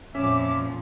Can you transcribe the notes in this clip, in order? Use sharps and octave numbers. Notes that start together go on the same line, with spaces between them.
F2 A#2 F3 C#4 E5 D6